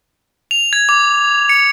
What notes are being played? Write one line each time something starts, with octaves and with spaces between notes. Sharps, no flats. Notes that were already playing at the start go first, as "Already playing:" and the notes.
F7
G#6
D6
C#7